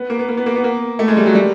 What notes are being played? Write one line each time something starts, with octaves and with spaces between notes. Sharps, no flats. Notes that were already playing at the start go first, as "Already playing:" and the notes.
Already playing: B3
A#3
B3
A#3
B3
A#3
B3
A#3
A3
G#3
G3
F#3
G3